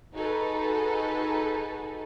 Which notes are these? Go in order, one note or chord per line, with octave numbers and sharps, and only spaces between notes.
D#4 F#4 G#4 A4 B4